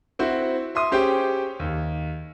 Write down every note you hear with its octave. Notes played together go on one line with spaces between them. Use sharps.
C4 E4 F#4 C5
E5 C6 D#6
C#4 G4 G#4 C5 G5
D#2